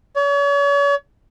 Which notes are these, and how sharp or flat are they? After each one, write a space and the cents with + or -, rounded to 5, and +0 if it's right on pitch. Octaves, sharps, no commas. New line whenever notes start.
C#5 +40